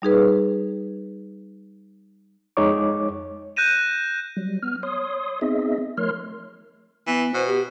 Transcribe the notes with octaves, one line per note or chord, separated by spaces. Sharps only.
G3 D#4 G#4 B4
F2 G#3 D#4 C#5 D6
F#6 G6 A#6 D#7 E7
F#3 G3
B3 F6
C#5 C6 D#6
B3 C4 D#4 G#4 D#5 E5
F3 A3 A#4 C#5 C6 F6
E3 B3
B2 C5
G4